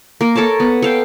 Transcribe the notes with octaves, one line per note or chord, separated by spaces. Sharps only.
A#3 A#4
A4 A#4 C#5 A5
B3
A4 F5 G5